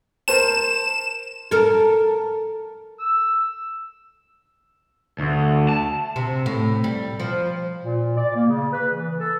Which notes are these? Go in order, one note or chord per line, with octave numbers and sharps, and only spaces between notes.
A#4 C5 A5 E7
A4 A#4
E6
D2
A5
C3
A2
G3
F3
A#2
D5
A#3
C#3
B4
E3
A4